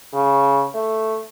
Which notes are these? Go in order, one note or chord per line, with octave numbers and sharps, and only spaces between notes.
C#3
A3